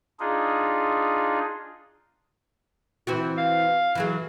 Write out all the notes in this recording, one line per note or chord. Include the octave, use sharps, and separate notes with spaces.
D4 D#4 F4 G#4
E3 C4 F#4
F5
E3 F#3 G#4